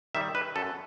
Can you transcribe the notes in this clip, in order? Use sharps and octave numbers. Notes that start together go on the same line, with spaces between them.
D#3 G3 E5
B4
F#2 A4